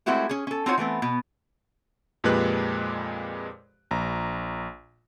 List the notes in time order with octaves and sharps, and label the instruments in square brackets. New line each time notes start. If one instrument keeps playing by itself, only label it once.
[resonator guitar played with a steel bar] G#3 A3 C4 E4 F#4 G4
C#4 G#4
C#4 A4
C4 D#4 F4 F#4 C5 C#5
E3 A3 B3 C4
B2 B3
[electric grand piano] F2 A#2 G#3 G4 B4 F#6
A#1 A#5